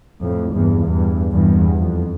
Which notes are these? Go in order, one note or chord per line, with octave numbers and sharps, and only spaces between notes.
F2 A2
E2 G2
E2 G2
E2 G2
F2